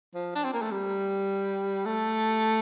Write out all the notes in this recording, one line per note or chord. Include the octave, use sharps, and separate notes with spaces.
F3
D4
C4
A#3
A3
G3
A3